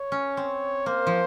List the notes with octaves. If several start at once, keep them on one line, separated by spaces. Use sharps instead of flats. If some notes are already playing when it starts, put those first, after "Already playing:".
Already playing: C#5
C#4
C4
A#3 C5
F3